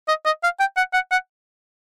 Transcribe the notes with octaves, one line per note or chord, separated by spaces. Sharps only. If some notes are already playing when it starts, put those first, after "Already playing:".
D#5
D#5
F5
G5
F#5
F#5
F#5